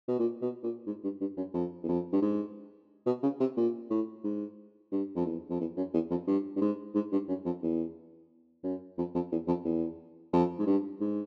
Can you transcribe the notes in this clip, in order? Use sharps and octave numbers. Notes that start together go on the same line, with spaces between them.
B2
A#2
B2
A#2
G#2
G2
G2
F#2
F2
E2
F2
G2
G#2
B2
C#3
C3
A#2
A2
G#2
G2
F2
E2
F2
E2
F#2
E2
F2
G2
G2
G#2
G#2
G2
F#2
F2
E2
F#2
F2
F2
E2
F2
E2
F2
G#2
G2
G#2